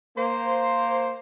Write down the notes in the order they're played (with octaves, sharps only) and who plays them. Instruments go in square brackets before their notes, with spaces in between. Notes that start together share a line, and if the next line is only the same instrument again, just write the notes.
[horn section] A#3 C5